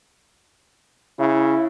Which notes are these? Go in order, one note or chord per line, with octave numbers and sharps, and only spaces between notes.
C#3 E4